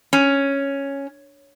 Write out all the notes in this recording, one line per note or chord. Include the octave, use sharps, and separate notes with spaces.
C#4